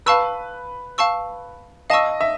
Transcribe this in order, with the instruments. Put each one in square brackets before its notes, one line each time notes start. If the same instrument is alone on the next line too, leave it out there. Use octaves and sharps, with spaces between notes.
[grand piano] B4 [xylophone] F5 A5 C#6 E6
[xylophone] F5 A5 C#6 E6
[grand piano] D#5 [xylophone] F5 A5 C#6 E6
[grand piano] E5